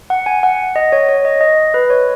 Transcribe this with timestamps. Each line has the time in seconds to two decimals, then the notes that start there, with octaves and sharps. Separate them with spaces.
0.10 F#5
0.26 G#5
0.43 F#5
0.76 D#5
0.92 C#5
1.09 C#5
1.25 D#5
1.41 D#5
1.74 B4
1.90 C#5